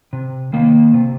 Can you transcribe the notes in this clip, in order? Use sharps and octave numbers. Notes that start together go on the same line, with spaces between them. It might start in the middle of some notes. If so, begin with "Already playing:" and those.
C3
D#3 A#3
C3